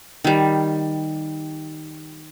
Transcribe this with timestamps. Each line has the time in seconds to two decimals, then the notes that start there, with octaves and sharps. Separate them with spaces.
0.24 D#3 G3